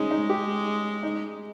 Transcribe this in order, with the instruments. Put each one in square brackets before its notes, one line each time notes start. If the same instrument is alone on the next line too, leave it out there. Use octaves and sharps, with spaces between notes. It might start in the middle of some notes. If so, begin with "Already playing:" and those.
Already playing: [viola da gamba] G#3 [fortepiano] C#4 D#4
[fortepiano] D#4
G4
D#4